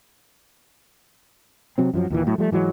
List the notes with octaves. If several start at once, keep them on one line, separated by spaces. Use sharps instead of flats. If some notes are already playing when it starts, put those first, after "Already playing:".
C3 F#3 C4
F#2 F3 F#3
D#2 A#2 E3
A2 F#3 A3
F3 G3 A3
G#2 E3 F#3 G#3